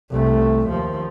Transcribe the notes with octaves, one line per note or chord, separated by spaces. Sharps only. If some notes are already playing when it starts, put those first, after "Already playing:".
C2 A3
D#2 F3